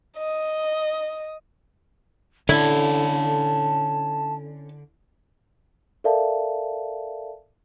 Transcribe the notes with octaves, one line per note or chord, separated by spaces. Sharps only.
D#5
D3 C#4 E4 A4 A5
A4 A#4 D5 E5 F5 A5